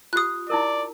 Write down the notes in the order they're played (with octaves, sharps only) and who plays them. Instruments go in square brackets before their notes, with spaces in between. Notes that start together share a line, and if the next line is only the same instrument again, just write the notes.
[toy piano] F4 G4 [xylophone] D#6 F#6
[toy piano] D#4 E4 A#4 [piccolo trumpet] D5